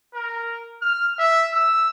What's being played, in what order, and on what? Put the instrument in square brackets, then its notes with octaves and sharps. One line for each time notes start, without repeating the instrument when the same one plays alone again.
[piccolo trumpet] A#4
F6
E5
E6